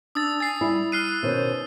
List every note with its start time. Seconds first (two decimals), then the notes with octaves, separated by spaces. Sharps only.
0.15 D4 D#6 E6 A6
0.40 G#5 A6 C7
0.61 G3 E4
0.92 F6 F#6 C7 D#7
1.23 B2 D#3 C#4 C5